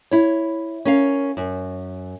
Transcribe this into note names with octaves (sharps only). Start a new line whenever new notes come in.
E4 C#5
C#4 A#4 F5
F#2